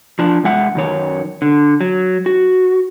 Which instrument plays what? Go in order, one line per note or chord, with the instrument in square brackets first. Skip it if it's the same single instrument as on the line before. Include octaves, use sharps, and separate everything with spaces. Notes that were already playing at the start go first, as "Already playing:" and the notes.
[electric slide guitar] F3 D4
E2 G#3 E5 F#5
F#2 D#3 C#5
D3
F#3
F#4